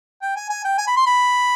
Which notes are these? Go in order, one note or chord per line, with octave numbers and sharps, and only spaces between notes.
G5
G#5
G#5
G5
G#5
B5
C6
B5